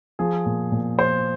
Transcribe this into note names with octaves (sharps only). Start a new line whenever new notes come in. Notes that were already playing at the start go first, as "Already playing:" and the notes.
F3 G#4
A#2
A#2
F3 C5